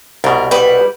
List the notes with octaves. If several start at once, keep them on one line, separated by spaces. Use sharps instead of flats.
C2 B2 A#4
G3 E4 B4